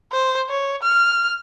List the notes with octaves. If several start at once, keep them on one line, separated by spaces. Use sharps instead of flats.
C5
C#5
F6